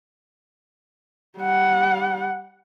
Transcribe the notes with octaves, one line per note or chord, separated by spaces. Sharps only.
G3 F#5